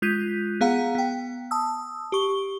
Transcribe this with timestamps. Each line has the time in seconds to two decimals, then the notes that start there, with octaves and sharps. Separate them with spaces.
0.02 G#3 F4 F#6 G6 B6 D#7
0.61 B3 G#4 F5 F#5 A#5
0.95 B3 G5
1.51 A5 D#6 E6
2.12 G4 C#6 G7